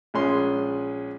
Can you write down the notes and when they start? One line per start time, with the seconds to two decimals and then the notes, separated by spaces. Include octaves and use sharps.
0.14 A#1 G#3 C#4 C6